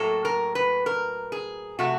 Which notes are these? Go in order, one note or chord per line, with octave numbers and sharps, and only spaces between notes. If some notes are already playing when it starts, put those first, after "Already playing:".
Already playing: A2 F#3 A#3 A4
A#4
B4
A#4
G#4
C3 F3 A3 F#4